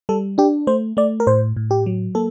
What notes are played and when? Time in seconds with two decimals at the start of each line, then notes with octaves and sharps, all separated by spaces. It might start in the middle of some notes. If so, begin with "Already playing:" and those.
0.09 G3 A4
0.38 D4 G4
0.67 A3 C5
0.97 A3 D5
1.20 A#4
1.27 A2 C5
1.56 A2
1.71 G4
1.86 F#3
2.15 A#3 A4